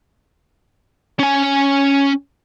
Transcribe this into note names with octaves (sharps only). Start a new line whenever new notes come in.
C#4 G#5